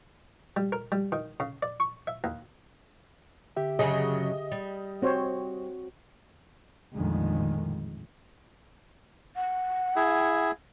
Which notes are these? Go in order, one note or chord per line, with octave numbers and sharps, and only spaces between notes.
G3
A#4
G3
D#3
C#3
D5
C#6
E5
D#2
D3 G4 E5
F#2 C#3 F#3 G#4 D#5
G3
C4 F#4 C5 C#5
A#1 F2 A2 D3 D#3 G#3
F#5
E4 G#4